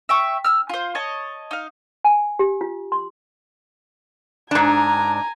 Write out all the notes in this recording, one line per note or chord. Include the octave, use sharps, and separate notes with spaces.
E5 G5 C#6
E6 F6
F4 C5
C#5 D#5 A5
D#4 F5
G#5
G4
F4
C6
G#2 D4 G#5 A#5